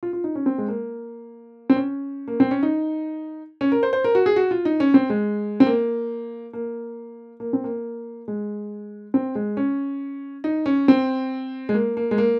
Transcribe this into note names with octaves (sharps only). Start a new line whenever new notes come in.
F4
F4
D#4
C#4
C4
G#3
A#3
C4
C#4
A#3
C4
C#4
D#4
C#4
A#4
C5
C5
A#4
F#4
G#4
F#4
F4
D#4
C#4
C4
G#3
C4
A#3
A#3
A#3
C4
A#3
G#3
C4
G#3
C#4
D#4
C#4
C4
G#3
A#3
A#3
G#3
A#3